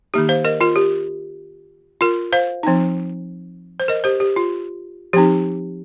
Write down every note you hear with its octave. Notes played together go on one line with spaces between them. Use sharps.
D#3 A#3 D#4 G4
C5 F5
A#4 D#5
F4 A#4
G4
F4 A#4
C5 F5
F3 C4 D#4
C5
A#4 D#5
G4 C5
G4
F4
F3 C4 D#4 G4